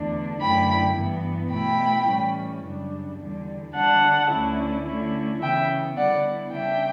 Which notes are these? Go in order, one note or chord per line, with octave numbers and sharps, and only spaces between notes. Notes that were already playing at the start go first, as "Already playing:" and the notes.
Already playing: E2 D3 A3 D4
F#2 D3 A3 E4 G5 B5
G2 E3 B3
B2 A3 E4 G5 B5
A2 E3 G3 C#4
F#2 C#3 G3 D4
E2 D3 G3
D3 G3 D4 F#5 A5
D2 D3 A3 C#4 E4
D3 A3 C#4 E4
C#3 E3 B3 E5 G5
D3 G3 B3 E4 D5 F#5
C#3 G3 D4 E5 G5